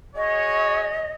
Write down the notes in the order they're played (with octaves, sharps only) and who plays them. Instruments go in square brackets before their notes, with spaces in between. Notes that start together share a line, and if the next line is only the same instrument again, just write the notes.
[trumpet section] F#4 G#4 C#5 [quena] D#5